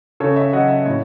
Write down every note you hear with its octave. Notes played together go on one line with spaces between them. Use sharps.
C#3 A4 C#5
C#5 E5
F#3 D#5 F#5
C#5 E5
A2 C#5 E5